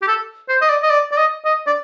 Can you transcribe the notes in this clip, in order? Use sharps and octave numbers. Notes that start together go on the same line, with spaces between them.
G4
A4
C5
D#5
D5
D#5
D5
D5
D#5
D#5
D5